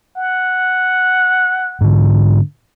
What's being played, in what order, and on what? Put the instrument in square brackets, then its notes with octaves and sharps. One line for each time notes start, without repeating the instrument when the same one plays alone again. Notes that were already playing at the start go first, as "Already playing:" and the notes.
[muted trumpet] F#5
[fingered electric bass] G#2 D3